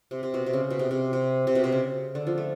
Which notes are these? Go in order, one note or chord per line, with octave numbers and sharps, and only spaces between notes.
C3
C3
B2
C3
C#3
B2
C3
C3
C3
C3
B2
C3
C#3
D3
F3
A3